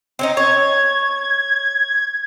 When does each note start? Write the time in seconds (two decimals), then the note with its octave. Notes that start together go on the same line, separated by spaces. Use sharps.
0.19 C4 C#4 D#4
0.37 C#5 G#6